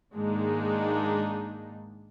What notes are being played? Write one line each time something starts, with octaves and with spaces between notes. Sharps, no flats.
G#2 D#3 G#3 A#3 D4 D#4